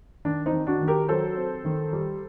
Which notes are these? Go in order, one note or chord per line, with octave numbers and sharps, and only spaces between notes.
D#3 D4
C4 D#4
D#3
D4 F#4
D#3
G4 A#4
F#3 A4 C5
C4
D#3
G3